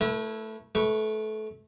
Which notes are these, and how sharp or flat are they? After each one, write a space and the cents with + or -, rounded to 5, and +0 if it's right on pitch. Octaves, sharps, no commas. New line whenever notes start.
A3 +0 E4 +0 B4 -45
A3 -25 B4 -20 C#6 +0